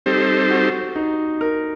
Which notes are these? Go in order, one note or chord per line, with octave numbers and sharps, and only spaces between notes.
G3 C4 D#4 G4 A4 C5
F#4
D#4
A#4